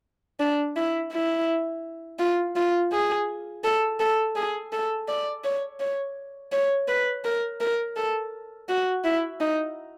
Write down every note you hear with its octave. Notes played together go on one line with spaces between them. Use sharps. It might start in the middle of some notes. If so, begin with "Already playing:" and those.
D4
E4
E4
F4
F4
G#4
A4
A4
G#4
A4
D5
C#5
C#5
C#5
B4
A#4
A#4
A4
F#4
E4
D#4